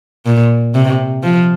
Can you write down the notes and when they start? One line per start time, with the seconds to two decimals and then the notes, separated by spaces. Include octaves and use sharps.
0.26 A#2
0.75 C3
1.23 F3